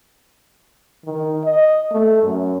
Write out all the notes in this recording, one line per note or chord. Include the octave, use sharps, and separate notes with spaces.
D#3
D#5
A3
F#2